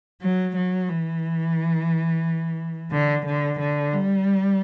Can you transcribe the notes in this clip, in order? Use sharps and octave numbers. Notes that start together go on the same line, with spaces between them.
F#3
F#3
E3
D3
D3
D3
G3